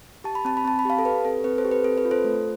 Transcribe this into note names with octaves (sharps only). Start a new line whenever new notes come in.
G4 A5
B5
C4 A5
B5
C4 A5
B5
G4 F5 A5
A4
G4 B4
C4 A4
C4 B4
A4 C5
G4
B4
C4 A4
B4
F4
A4 C5
A3